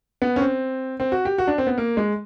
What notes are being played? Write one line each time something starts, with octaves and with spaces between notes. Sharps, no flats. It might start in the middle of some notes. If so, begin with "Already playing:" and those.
B3
C#4
C4
C4
F#4
G4
F#4
D4
C4
B3
A#3
G#3